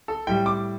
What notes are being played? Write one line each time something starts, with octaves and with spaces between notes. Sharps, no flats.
A4
A2 G3 G5
D6